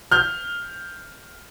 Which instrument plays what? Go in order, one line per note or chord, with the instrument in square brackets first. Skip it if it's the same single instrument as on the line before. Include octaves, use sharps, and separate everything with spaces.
[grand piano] F6 G6